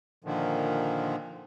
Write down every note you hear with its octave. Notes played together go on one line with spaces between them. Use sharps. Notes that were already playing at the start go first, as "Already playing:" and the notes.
A#2 D3 D#3 F3